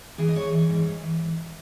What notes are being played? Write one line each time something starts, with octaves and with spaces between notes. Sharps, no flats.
E3 G#4
D#5
E3 C#5
E3
G#2
G#2
E3